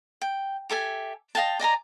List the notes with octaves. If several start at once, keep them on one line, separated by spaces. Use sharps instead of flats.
G5
G4 A4 E5 G#5
D#5 F5 G5 A5
D5 D#5 G#5 A#5